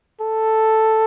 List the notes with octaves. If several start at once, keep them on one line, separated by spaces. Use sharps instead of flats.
A4